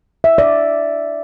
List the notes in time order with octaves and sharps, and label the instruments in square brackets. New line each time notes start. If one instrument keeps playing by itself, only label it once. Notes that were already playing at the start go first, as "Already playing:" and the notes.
[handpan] E5
D5